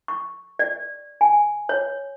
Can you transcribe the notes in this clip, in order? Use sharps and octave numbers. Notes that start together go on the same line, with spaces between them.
C#6
D5
G#5
C#5